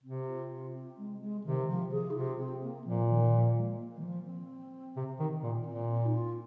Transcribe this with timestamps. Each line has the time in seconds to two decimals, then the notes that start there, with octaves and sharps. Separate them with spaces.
0.04 C3 C4
0.27 F4
0.50 F4
0.74 C4
0.97 G#3
1.21 G#3
1.44 C3 D#3
1.68 F3
1.91 G#4
2.10 D#4
2.15 C3 F4
2.38 C4
2.62 A#3
2.85 A#2 F3
3.08 D#3
3.32 F3
3.56 G#3
3.78 A#3
3.98 D#3
4.03 F3
4.26 C4
4.96 C3
5.19 D#3
5.43 A#2
5.66 A#2 C4
5.90 F4
6.05 D#4
6.14 F4